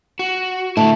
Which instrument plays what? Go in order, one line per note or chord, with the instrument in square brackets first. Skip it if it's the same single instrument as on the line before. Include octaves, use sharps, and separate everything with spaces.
[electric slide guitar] F#4
[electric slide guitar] D3 E4 [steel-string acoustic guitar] A3